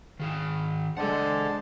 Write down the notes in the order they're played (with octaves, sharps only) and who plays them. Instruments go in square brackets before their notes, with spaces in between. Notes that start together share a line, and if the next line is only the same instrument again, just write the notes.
[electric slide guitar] D#3 G#4 [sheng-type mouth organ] F5
[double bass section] G#3 [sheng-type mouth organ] D4 C5 A5 [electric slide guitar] A4 F#5